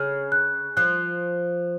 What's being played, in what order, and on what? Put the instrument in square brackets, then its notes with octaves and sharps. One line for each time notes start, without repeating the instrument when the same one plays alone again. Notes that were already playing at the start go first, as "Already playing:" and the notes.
Already playing: [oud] C#3 [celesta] F6
[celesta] F#6
[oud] F3 [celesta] F#6